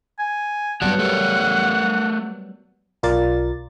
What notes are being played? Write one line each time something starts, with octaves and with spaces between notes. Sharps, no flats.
G#5
F#3 G3 B3 G4 D5 F#5 A5
A3 A4 A#4
B1 F4 A#4 D5 A6